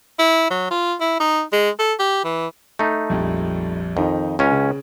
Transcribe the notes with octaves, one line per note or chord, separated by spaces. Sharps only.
E4
F#3
F4
E4
D#4
G#3
A4
G4
E3
A3 D#4
A#1 F2 G3
F2 D#3 D#4
C#2 C#4
C#3